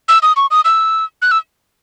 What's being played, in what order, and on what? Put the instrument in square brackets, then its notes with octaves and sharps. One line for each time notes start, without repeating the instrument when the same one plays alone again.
[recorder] E6
D#6
C#6
D#6
E6
F#6
E6